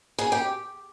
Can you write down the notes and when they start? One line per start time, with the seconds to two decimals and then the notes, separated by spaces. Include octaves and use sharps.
0.18 G#4
0.32 G4